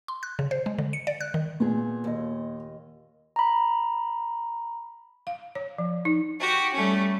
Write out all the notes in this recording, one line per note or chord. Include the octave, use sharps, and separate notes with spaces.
C6
F#6
C#3
C5
G#3
D3
C#7
D5
F#6
D#3
A#2 B3 G#4
D#2 D#5
A#5 B5
F5
C#5
F3
D#4
F#4 G4
G3 A3 C#4